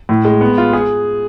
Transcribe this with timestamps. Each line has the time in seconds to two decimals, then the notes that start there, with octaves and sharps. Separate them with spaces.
0.09 A2
0.25 G#3
0.41 B3
0.58 F4
0.73 G#4